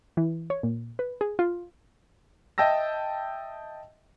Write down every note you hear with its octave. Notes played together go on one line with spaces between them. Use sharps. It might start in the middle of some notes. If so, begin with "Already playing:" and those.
E3
C#5
A#2
B4
G#4
F4
D#5 E5 G5 A5 E6 A#6